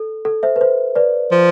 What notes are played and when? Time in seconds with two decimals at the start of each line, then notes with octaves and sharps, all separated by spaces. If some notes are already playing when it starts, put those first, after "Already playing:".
Already playing: A4
0.25 A4
0.43 C5 E5
0.56 B4
0.61 C5
0.95 B4 D5
1.31 F3